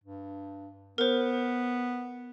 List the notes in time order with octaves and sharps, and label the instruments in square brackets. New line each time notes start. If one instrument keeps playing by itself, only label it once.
[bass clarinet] G2
[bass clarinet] B3 [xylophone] A#4 C5